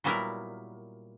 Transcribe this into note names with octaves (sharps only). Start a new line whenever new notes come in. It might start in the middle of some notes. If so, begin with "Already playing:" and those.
A#2 F#3 G3 B3 E4 A#4